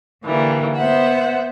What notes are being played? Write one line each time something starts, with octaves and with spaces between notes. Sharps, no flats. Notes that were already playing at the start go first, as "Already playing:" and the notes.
D3 E3 G3 A#3
B3 C5 E5 F#5